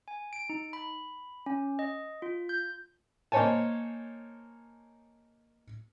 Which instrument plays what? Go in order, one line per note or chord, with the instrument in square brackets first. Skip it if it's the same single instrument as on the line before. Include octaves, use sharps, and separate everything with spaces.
[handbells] G#5
D7
D#4
B5
C#4
D#5
F4
G6
[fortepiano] A#3 D#4 C5 C#5 G#5 A5